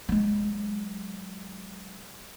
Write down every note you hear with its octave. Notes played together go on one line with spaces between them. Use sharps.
F#3 G#3